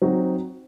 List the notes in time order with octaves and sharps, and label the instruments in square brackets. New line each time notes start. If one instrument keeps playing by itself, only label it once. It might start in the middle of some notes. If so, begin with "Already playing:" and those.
[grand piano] F#3 C4 D#4 F#4